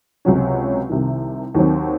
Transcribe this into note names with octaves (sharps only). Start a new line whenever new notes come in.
C#2 C3 F#3 C#4
C2 C3 D#3
D#2 D#3 F#3 C4